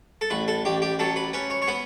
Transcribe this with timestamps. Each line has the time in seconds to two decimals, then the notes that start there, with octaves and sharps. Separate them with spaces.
0.21 A4
0.30 A1 B4
0.48 A4
0.65 A1 G4
0.82 G4
0.99 F#3 A4
1.16 B4
1.33 C#4 B4
1.50 C#5
1.62 C#5
1.68 B3 B4